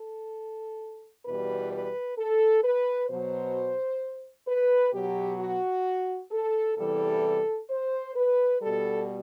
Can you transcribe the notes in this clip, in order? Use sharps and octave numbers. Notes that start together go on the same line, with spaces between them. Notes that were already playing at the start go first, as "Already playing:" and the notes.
Already playing: A4
E2 B2 G3 B4
B4
A4
B4
B2 F#3 C5
B4
B2 F#3 G4
F#4
A4
E2 C3 E3 G3 A4
C5
B4
B2 G3 A4